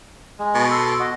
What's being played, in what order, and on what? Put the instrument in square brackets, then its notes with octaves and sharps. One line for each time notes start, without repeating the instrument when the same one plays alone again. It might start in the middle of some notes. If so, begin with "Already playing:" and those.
[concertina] G#3
[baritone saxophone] B2
[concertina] A4 C6
F#4 D#5